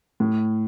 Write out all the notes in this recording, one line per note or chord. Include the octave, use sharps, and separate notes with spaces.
A2